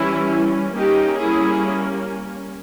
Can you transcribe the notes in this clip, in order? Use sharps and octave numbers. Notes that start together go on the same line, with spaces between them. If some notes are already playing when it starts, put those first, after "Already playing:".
Already playing: E3 G3 C#4 E4
G3 A#3 C#4 D#4 G4
E4 G#4